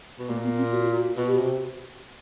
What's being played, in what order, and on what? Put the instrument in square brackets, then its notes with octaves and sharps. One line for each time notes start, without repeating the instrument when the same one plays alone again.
[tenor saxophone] B2
[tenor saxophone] A#2 [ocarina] A#3
[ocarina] B3
C4
F#4
F4
F#4
[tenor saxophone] B2 [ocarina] F#4
[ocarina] G4
[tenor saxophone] C3 [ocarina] F#4